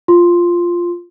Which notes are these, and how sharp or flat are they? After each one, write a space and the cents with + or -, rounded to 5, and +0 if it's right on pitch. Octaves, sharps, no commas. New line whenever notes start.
F4 +0 C6 +0